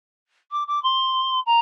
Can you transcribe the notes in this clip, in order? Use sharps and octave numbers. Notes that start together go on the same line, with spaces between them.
D6
D6
C6
A#5